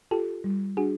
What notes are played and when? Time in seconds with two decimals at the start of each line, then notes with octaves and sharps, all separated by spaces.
0.11 F4 G4 A4
0.44 G3
0.77 D4 F#4 G#4